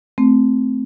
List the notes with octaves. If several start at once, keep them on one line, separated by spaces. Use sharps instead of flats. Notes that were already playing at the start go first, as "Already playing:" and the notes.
A3 C4